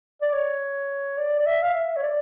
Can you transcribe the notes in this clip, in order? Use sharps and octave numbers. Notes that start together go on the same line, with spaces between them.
D5
C#5
D5
D5
E5
F5
E5
C#5
D5